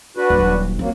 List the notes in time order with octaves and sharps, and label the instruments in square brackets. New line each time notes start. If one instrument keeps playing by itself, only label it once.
[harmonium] D4 F#4 B4
[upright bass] D#1 F#3
[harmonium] F#3 A#3 [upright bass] C4